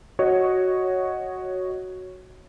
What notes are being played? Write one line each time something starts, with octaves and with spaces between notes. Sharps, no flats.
F#4 C#5 D#5